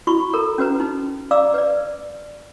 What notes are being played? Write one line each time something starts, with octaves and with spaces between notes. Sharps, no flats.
E4 F#4 B5 C#6
A4 A#4 A#5
C#4 F#4 B4 A#5
D#4
D5 F5 A#5 D6 E6
B4 D5